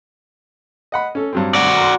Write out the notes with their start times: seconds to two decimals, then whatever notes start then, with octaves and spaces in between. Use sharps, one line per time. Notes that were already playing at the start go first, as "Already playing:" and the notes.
0.92 D#5 F#5 B5
1.15 C#4 A4
1.33 G2 F#3 C4
1.55 F#4 D5
1.77 A#5 C6